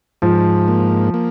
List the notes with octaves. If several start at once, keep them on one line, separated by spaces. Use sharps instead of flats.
G#2 F3
A#3
A#3